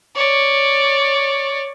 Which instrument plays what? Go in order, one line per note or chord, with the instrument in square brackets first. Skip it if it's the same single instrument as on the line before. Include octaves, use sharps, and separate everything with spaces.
[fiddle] C#5 D5